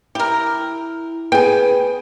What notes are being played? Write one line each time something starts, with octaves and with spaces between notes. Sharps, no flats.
E4 G4 A#4
B3 G#4 G5 G#5